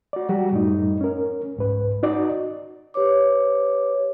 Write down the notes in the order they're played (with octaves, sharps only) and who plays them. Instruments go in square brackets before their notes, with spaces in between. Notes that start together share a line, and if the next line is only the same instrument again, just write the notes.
[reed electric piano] F#4 D5
F#3 G3 F#4 G4
F#2 A2 G3 A3 D#4
C#4 A#4
C2 G#2 B4
D#4 F#4 D5 D#5
[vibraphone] G4 B4 C#5 D6